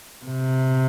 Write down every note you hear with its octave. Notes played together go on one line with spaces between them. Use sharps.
C3